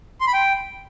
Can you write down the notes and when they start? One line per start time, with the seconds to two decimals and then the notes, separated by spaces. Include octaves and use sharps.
0.21 C6
0.27 B5
0.34 G5